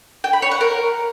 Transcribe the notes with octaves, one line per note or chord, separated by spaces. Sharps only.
G5
B5
C#5
F#5
A#4